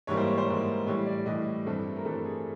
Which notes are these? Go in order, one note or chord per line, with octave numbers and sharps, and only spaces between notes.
G#2 E3 G3 A#3 C#5
C5
C#5
C5
G#2 E3 G3 A#3
A2 E3 G3 C#5
D5
A2 E3 G3 D#5
G2 E3 A3 C4
A#4
G2 E3 A3 C4 A4
G#4